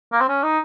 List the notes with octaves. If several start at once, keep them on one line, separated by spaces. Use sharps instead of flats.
A#3
C4
C#4
D#4